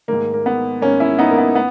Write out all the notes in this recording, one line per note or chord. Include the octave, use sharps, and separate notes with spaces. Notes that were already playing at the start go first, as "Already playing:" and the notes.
G#2 D#3 A#3
A#3
B3
G#2 D#3 A#3 C#4
C#4 E4
B3 D#4
A#3
B3
B3